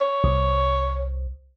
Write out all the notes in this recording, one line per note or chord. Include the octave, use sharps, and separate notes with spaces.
C#5
C2